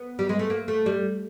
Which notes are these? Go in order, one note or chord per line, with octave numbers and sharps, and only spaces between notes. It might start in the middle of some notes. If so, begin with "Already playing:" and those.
Already playing: B3
G3
G#3
A3
A#3
A3
G3